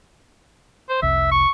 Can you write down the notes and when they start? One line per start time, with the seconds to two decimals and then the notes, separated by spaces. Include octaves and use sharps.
0.89 C5
1.02 F1 C2 E5
1.31 C#6